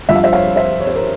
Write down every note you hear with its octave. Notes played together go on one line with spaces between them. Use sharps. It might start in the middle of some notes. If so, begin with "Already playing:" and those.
G2 F3 E5
F5
C5 E5
C#5 F5
C5 E5
C#5
C5
A#4 C#5